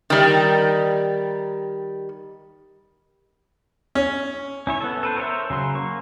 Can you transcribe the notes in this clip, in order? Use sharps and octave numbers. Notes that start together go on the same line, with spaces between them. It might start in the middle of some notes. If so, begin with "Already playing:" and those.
D#3 G3
C#4
C#4 E4 C#5
B3 A4
A4 B4 C5
A#4 C5 C#5 E5
C#3 F#3 C6
A#3 C#6